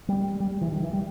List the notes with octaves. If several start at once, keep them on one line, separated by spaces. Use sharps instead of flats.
G3
G3
G3
E3
D#3
E3
G3